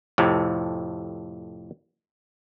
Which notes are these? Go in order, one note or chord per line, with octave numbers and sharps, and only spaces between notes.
F2 A2 C3